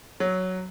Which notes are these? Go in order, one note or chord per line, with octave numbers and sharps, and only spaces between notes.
F#3